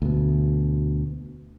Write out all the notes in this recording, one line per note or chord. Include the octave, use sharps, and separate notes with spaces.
D2 B2